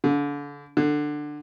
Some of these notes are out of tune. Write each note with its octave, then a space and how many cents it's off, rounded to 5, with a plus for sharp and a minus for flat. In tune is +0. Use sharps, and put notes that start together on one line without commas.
D3 -30
D3 +15